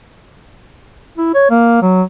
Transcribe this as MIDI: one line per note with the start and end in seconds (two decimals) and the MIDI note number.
1.17 1.30 64
1.35 1.50 73
1.50 1.78 58
1.82 2.02 54